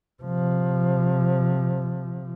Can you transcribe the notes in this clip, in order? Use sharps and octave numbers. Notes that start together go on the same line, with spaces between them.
C3 F3